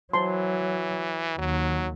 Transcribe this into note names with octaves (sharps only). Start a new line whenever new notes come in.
E3 F#3 C5 A5 C6
D#2 F#3